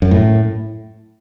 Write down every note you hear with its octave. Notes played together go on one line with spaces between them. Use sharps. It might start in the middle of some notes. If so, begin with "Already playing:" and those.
F#2
A2